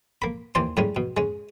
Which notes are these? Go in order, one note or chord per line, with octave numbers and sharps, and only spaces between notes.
A#3 B5
D#2 E3 C5 D5 C6
A2 G3 G#3 C#4
B2
G#3 C#4